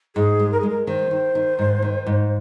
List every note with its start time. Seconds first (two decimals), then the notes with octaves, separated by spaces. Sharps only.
0.16 G#2 G#4
0.39 G#3
0.52 A#4
0.60 G#3 G#4
0.69 A#4
0.86 D#3 C5
1.11 D#3
1.35 D#3
1.59 G#2
1.82 D#3
2.06 G#2